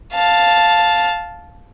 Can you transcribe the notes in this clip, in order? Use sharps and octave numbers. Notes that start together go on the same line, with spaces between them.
F5 A5